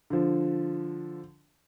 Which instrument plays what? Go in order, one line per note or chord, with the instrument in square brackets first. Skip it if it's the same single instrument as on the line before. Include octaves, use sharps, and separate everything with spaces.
[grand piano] D3 F3